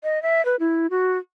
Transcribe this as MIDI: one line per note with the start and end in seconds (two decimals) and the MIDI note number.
0.03 0.21 75
0.22 0.44 76
0.45 0.56 71
0.60 0.87 64
0.90 1.18 66